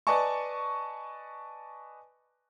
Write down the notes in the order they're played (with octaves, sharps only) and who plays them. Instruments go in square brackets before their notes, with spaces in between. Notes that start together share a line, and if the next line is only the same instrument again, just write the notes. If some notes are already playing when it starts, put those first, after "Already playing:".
[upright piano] B4 D5 D#5 G#5 A5 C#6